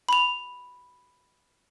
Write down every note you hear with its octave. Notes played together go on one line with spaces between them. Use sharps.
B5 F7